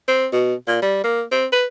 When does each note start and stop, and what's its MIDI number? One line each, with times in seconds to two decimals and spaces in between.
0.08 0.27 60
0.33 0.54 47
0.68 0.82 46
0.82 1.02 55
1.04 1.22 58
1.32 1.46 60
1.53 1.66 71